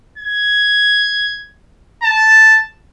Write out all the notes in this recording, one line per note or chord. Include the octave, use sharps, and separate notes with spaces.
G#6
A5